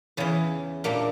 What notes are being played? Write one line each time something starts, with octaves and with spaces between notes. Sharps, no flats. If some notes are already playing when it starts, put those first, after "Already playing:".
E2 C#3 E3
A#2 G3 A#3 D4